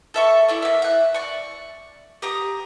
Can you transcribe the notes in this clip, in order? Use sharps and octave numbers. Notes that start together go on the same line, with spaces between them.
A4 E5 C#6
E4 A4 D5
A#3 E5
E5 F#6
D5 C#6
G4 A#5 D#6